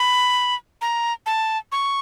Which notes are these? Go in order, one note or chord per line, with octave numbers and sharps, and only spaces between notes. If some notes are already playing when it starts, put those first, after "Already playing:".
Already playing: B5
A#5
A5
C#6